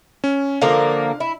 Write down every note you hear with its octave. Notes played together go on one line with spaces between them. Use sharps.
C#4
D3 F3 A#3 F5
E4